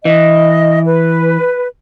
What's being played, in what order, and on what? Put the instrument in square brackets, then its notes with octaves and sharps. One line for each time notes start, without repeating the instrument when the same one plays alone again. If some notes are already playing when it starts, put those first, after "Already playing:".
[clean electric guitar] E3 [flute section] D#5
[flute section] B4